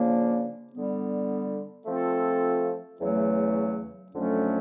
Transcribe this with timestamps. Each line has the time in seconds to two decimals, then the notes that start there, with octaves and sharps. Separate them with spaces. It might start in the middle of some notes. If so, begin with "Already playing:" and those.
Already playing: C#3 F3 A#3 D4
0.73 D3 G3 B3
1.86 F3 A3 C4 F4 A4
2.99 E2 C#3 F#3 A3
4.12 F2 D3 F#3 A3 C#4